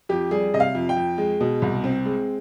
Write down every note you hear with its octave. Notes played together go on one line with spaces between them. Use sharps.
F2 G4
G3 G#4
C3 D#5
F5
F2
G5
F2
G#3
B2
C2
C4
G#3